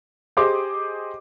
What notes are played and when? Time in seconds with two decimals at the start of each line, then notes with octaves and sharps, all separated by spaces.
0.37 G4 G#4 C5 D#5 C6 D6